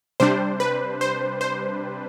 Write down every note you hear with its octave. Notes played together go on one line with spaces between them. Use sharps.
C3 G3 D4 C5
B4
C5
C5